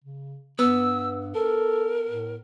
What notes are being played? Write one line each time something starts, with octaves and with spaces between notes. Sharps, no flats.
C#3
G2 B3 E6
A4 A#4
A2